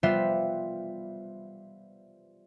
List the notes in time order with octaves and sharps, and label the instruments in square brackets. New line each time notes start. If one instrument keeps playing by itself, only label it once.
[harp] G3 B3 F4 C5 E5